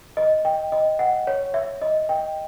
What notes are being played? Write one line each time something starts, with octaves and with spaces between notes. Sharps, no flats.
D#5
G5
D#5
F#5
C#5
E5
D#5
G5